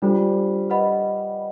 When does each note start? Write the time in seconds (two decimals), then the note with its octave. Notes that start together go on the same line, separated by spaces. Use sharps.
0.02 G3 D4 F4 A4 C5
0.70 B4 D#5 F#5 B5